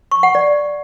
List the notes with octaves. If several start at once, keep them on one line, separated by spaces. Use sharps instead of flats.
C#6
F#5
D5